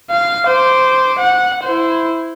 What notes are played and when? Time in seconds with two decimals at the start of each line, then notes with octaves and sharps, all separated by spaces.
0.11 F5
0.47 C5 D6
1.19 F#5
1.63 E4 C5